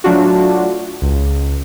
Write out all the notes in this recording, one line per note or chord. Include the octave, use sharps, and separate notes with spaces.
F#3 A3 D4 F4 F#4
C#2